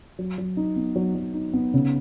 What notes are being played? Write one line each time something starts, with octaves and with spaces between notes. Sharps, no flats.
F#3
F#3
D#4
B3
F#3
F#3
D#4
B3
C#3